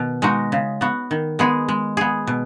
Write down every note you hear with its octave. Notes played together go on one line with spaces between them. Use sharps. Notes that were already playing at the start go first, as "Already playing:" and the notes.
Already playing: B2 D#3
G#3 D#4 F#4
C#3
B3 F#4
D#3
G#3 B3 G#4
G#3
B3 G#4
B2